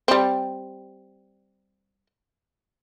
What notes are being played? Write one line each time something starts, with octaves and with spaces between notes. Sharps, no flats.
G3 C4